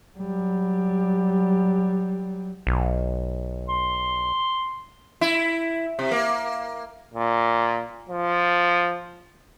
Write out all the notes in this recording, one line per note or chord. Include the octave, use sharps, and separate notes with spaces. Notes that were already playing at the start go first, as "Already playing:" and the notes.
F#3 G3
B1
C6
E4
C3
A#3
A#2
F3